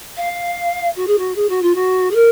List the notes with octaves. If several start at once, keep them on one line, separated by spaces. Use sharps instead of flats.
F5
F#4
G#4
F#4
G#4
F#4
F4
F#4
G#4
A#4